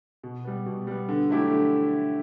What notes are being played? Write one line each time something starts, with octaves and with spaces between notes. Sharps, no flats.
B2
G3 B3
B2
G3 B3
D3
F#3 A3 E4 G4
D3